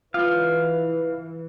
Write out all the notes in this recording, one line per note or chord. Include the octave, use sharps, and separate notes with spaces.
E3 F4 B4 F5